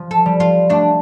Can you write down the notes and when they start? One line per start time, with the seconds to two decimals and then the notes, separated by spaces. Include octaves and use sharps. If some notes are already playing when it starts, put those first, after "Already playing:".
Already playing: F3
0.11 A4
0.26 G3
0.40 F4
0.69 A3 D4